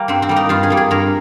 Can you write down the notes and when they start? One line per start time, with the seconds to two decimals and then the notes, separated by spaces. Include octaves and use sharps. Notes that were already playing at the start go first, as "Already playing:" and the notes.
Already playing: G3 A#3
0.08 G2 C4
0.22 C4
0.29 G3 A#3
0.36 D#4
0.49 G2 F4
0.63 G#4
0.70 G3 A#3
0.77 G#4
0.91 G2 A#4